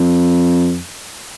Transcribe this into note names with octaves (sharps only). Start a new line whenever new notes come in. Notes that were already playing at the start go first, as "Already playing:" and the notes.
Already playing: F2